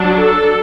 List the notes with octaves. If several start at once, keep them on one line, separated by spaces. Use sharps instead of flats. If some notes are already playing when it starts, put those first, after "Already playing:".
Already playing: F#3 D4
A4